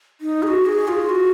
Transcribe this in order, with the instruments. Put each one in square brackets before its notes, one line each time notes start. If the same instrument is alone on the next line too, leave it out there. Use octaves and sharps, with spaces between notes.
[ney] D#4
G#4
F#4
G#4
F4
F#4